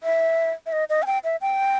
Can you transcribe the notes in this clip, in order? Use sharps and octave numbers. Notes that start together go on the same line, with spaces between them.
E5
E5
D#5
D#5
G#5
G5
E5
G5